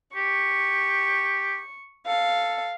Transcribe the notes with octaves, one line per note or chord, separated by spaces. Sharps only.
G4 C#6
A4 F5